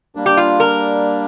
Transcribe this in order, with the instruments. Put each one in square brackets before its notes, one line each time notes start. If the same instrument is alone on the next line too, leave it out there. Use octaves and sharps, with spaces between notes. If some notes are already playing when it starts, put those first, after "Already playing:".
[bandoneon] G3 A#3 D4
[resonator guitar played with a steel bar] G4
F4
A#4